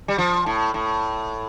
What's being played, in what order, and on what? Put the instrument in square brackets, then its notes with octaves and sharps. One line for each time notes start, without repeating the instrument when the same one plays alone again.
[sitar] G3
F3
A2
A2